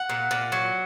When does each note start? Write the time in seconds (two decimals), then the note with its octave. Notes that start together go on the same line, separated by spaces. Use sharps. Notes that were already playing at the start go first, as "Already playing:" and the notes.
Already playing: F#5
0.09 A#2
0.31 A#2
0.52 F#3